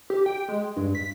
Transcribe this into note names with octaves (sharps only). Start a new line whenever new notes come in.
G4
G5
G#3
G2
B6